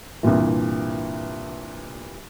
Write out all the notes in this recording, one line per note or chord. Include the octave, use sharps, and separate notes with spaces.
C2 G2 A#2 E3